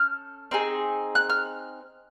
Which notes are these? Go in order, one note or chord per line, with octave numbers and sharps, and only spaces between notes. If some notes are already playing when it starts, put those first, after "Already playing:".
Already playing: C#4 A4 F6 G6
C4 D#4 G#4
F#6
F6